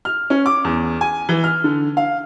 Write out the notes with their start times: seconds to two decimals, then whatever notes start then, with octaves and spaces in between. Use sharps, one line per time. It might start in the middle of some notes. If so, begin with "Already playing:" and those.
0.05 F6
0.30 C#4
0.46 D6
0.64 E2
1.01 G#5
1.29 E3
1.44 F6
1.64 D3
1.97 F5